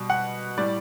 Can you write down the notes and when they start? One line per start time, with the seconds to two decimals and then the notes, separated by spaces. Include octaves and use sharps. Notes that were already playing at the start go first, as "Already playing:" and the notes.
Already playing: B2 G3
0.10 F#5
0.58 A2 G3 D5